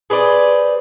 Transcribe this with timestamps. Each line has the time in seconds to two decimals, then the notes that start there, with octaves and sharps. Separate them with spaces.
0.10 G#4 B4 C5 D5